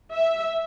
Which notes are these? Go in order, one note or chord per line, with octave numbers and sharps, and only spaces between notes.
E5